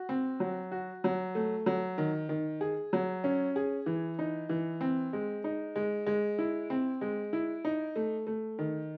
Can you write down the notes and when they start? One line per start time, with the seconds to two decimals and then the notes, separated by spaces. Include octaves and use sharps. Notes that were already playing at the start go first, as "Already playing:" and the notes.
Already playing: F#4
0.09 C4
0.40 F#3
0.72 F#4
1.04 F#3
1.35 A3
1.66 F#3
1.98 D#3
2.29 D#3
2.61 G#4
2.93 F#3
3.24 C#4
3.56 G#4
3.86 E3
4.19 D#4
4.49 E3
4.81 C4
5.13 G#3
5.44 D#4
5.76 G#3
6.06 G#3
6.39 E4
6.70 C4
7.01 G#3
7.33 E4
7.65 D#4
7.96 A3
8.27 A3
8.59 D#3